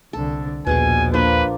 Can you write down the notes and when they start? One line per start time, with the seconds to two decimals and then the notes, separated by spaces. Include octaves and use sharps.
0.13 C2 D3 A4
0.67 A#1 D#2 B2 G#4 G#5 C#6
1.14 F3 A#3 D4 B4